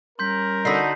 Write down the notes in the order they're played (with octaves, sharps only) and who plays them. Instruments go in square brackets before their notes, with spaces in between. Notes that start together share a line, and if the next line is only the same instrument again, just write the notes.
[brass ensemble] G3 C#4 A#4 [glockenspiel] C6 G6 B6
[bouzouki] D3 F#4 [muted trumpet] D#4 [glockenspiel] B5 B6 C7